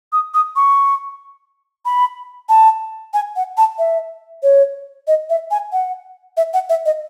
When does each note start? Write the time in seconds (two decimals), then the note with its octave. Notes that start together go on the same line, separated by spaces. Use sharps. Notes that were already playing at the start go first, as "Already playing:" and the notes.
0.13 D#6
0.34 D#6
0.56 C#6
1.85 B5
2.49 A5
3.14 G#5
3.36 F#5
3.58 A5
3.79 E5
4.43 C#5
5.07 D#5
5.30 E5
5.51 G#5
5.72 F#5
6.37 E5
6.54 F#5
6.69 E5
6.86 D#5